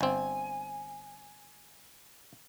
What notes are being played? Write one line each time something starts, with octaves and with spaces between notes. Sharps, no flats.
G1 C4 G#5